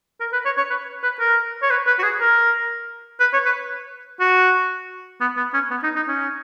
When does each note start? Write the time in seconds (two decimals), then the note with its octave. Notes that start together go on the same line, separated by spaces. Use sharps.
0.20 A#4
0.33 B4
0.46 C#5
0.58 C#5
0.70 B4
1.03 B4
1.20 A#4
1.63 C#5
1.70 B4
1.87 B4
1.99 F#4
2.04 G#4
2.21 A#4
3.20 B4
3.33 C#5
3.46 B4
4.20 F#4
5.21 B3
5.37 B3
5.54 C#4
5.71 B3
5.84 D#4
5.96 D#4
6.08 C#4